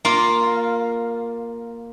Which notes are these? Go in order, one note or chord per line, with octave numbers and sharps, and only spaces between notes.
A#3 F4